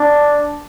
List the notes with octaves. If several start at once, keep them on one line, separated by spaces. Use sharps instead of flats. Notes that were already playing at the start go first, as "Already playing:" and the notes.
Already playing: D4